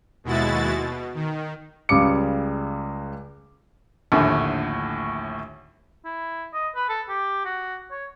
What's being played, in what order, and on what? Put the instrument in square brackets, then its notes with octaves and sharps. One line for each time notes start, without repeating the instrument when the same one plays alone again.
[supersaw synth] D#2 B2 G#3 E4 F#4 A6
B2
D#3
[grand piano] C#2 C#3 G3 D6 C#7
[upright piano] A#1 D#2 A2 D3 A3
[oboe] E4
D#5
B4
A4
G4
F#4
C#5